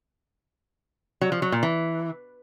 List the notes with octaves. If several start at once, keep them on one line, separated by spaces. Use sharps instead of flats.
F#3
F3
F#3
A#2
E3